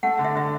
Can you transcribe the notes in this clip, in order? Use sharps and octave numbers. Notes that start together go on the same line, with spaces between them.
A3 F#5
D3
E5
D3 E5